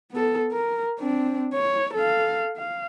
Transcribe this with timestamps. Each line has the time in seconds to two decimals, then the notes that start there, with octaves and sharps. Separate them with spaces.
0.11 B3 A4
0.52 A#4
0.99 C4 D4
1.54 C#5
1.94 A4 F5
2.57 F5